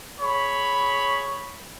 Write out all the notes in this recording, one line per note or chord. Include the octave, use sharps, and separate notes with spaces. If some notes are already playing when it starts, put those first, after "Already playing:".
G#4 C#5 B5